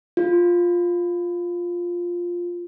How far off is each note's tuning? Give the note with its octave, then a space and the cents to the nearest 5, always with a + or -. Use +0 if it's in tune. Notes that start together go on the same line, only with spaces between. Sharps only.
F4 +5